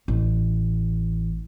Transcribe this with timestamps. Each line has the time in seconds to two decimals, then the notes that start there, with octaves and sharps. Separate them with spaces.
0.08 A1